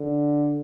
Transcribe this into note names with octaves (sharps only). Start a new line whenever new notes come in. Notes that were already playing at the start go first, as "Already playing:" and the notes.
Already playing: D3